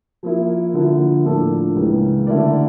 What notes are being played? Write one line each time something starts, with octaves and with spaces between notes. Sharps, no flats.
F3 A#3 E4
D3 F3 A#3 E4
A2 F3 A#3 D4 A4
C#2 C#3 E3 A#3
D3 A3 E4 A#4 D5